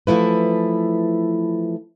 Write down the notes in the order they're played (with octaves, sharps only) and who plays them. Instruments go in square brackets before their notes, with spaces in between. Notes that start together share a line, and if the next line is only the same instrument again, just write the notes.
[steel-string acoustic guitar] E3 F3 A3 E4 B4